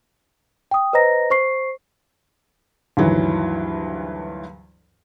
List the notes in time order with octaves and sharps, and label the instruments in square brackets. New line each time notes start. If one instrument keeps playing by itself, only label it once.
[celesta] G5 D#6
B4 C5 D#5 A#5 A#6
C5 C#6 C7
[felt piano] D2 G2 D#3 E3 F#3